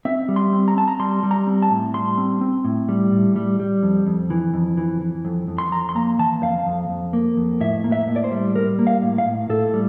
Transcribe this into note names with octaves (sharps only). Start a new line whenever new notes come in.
C4 E5
G3
C6
C4
A#5
C4 A5
A#5
G3 C6
G3
A#5
C4
A5
A2
G3 C6
C4
C4
A2
G3
A2
G3
G3
F2
F2
E3
F2
E3
E3
F2
F2
C6
F2 A#5
C6
A#3 A#5
E3 A5
F2 F5
F2
F2
A#3
F2
A2 E5
A#3
E5
A2
D5
C5
G3
G3 A#4
A#3
F5
A2
F5
A2
A2 A4
G3